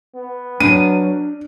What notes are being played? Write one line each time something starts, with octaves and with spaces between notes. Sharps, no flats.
B3
F#3 D4 D#7